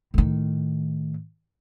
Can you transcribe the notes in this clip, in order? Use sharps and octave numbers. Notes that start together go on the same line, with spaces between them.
A2 D#3